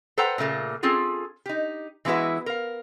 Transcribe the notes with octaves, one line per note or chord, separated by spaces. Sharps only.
A4 B4 C5 F#5 G5 A#5
A#2 C#3 A3 A#3
C4 C#4 F4 G#4 A4
D#4 G4
E3 G#3 B3 E4 F#4 B4
A#4 F5